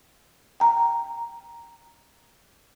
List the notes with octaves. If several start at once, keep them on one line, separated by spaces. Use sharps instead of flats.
G5 A#5